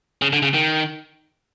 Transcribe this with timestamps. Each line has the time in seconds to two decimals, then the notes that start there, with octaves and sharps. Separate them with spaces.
0.22 C#3
0.33 D3
0.42 C#3
0.54 D#3